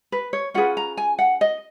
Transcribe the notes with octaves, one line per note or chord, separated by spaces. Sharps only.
B4
C#5
C#4 F4 G#4 B4 F#5
A#5
G#5
F#5
D#5